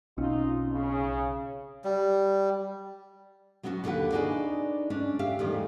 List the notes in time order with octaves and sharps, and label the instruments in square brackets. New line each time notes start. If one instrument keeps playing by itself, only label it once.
[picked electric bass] B1 C4 C#4 [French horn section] D#4 F4
[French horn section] C#3
[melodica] G3
[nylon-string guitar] F#3 B3 C#4 F4 F#4
D#2 D3 F4 G4 B4 F#5
D4 D#4 F#4 G#4 B4 D5
C#4 D4
G4 E5 F5
E2 A2 D#3 G3